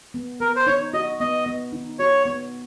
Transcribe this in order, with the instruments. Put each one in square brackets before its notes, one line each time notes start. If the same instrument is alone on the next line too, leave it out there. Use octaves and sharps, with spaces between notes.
[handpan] B3
[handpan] B3 [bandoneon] A#4
[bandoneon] C5
[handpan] D#4 [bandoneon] C#5
[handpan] F#4 [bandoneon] D#5
[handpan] B3 [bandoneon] D#5
[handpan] B3
D#4
[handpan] F#4 [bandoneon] C#5
[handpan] B3